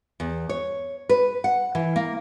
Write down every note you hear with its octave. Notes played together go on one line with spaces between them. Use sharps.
E2
C#5
B4
F#5
E3
A#3